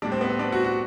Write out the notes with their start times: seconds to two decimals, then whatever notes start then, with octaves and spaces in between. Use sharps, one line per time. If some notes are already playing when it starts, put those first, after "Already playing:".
0.02 A2 G3 D4
0.12 C4
0.21 B3
0.29 C4
0.39 D4
0.52 F#4
0.64 F#4